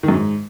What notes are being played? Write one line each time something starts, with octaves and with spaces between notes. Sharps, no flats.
D#3
F#2
G#2